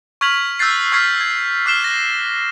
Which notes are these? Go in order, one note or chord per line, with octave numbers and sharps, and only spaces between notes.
C#6 F6 G#6 B6 F7 F#7
E6 F#6 G6 A6 C7
C#6 E6 F6 G#6 B6 C7
G#6
D6 F6 F#6 C7 E7 G7
A#6